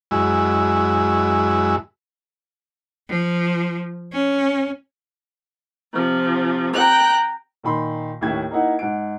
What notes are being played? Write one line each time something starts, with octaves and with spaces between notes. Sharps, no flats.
F#2 G#3 E4
F3
C#4
C3 F3
G5 A#5 F#6
A#2 D#3 B5 C6
D#2 A2 E4 E5 G#6
A#3 D#4 E4 F#5
G#2 F#5 D7